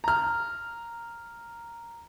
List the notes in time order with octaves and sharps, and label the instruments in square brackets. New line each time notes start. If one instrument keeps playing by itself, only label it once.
[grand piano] A#5 F6